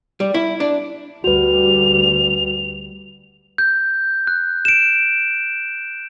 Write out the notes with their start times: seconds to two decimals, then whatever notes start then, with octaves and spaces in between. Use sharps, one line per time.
0.20 G3
0.34 E4
0.60 D4
1.24 D2 G3 F#4 B4 F7
3.58 G6
4.27 F#6
4.65 D7 E7